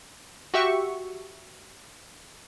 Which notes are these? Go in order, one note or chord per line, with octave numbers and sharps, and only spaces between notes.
F#4 G4 E5 C#6